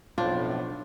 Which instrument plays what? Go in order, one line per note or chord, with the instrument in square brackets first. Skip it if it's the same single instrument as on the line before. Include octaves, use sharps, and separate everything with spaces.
[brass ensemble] B1 F2 A2 [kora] D4 [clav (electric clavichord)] F4 C5